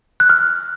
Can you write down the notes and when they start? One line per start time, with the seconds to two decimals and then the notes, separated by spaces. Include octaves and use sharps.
0.20 F#6
0.30 F6